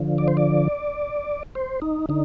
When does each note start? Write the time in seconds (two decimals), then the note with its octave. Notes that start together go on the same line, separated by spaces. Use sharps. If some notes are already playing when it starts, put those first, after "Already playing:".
Already playing: D3 F3
0.18 D5
0.28 C5
0.37 D5
1.55 C5
1.82 D#4
2.09 D3 D#4